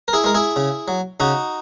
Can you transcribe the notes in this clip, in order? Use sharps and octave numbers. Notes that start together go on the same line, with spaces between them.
A#4
E4 G#4
G#3 A#4
E4 G#4
C#3
F#3
C#3 D#4 F#4